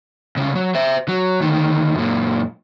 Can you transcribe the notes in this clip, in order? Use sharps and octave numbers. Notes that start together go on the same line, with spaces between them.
C2 C#3
F#3
C5 E5
F#3
D2 D#3
F#2 A#2